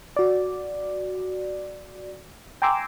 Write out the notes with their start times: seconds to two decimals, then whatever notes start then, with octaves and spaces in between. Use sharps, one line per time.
0.17 F#4 D5
2.62 G5 G#5 A#5 C6 D6 E6